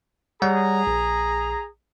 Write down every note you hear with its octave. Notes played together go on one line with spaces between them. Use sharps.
G3 G#4 C#5 F#5 A#5
A#1